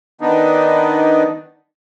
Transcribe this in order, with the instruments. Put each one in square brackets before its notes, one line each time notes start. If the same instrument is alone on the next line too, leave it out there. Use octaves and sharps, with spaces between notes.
[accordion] D#3 B3 D4 D#4